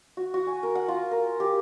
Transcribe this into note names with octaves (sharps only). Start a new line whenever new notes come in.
F#4
F#4
G#5
A#4
F#5
F4
A#4
G4